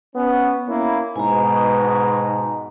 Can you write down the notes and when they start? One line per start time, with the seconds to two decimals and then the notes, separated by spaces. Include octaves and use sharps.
0.15 B3 C#4
0.67 A#3 C#4 E4
1.16 G#2 B2 G#5 A#5